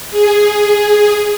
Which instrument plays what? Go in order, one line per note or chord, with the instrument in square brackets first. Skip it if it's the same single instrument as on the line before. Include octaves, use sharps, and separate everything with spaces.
[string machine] G#4